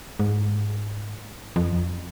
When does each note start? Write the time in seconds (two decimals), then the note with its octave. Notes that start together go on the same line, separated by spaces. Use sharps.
0.20 G#2
1.56 F2